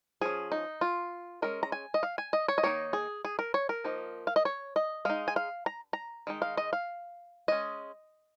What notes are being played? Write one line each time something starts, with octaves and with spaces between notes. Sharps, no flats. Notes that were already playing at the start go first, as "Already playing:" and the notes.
F3 C#4 G#4
D#4
F4
G#3 C#4 A#4
A#5
G#5
D#5
F5
G#5
D#5
C#5
D#5
D#3 A#3 D#4 C#5
G#4
G#4
A#4
C#5
A#4
F3 A#3 D#4
F5
D#5
C#5
D#5
G#3 D#4 F5
G#5
F5
A#5
A#5
D#3 G#3 D#4
F5
D#5
F5
G#3 C#4 D#5